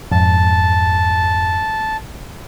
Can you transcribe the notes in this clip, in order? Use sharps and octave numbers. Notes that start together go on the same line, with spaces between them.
F2 G#2 A5